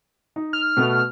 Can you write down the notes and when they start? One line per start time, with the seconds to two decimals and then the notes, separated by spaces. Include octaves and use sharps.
0.36 D#4
0.53 F6
0.77 B2 A3 B3